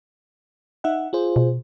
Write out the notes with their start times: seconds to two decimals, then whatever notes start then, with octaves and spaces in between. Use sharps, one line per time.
0.84 D#4 E5 F#5
1.13 F4 G#4 C5
1.36 B2